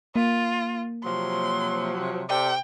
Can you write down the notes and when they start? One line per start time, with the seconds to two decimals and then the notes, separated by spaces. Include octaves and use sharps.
0.16 A#3 F4
1.05 C3 F3 F#3 C6
2.29 C3 A4 D5 G5